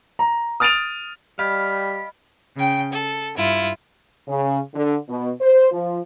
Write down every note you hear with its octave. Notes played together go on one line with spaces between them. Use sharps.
A#5
D#6 F6 A6 D7 D#7 F7
G3 D#5 F5 G5 B5 B6
C#3 G5
A4
G2 E4 F4
C#3
D3
B2
C5
F3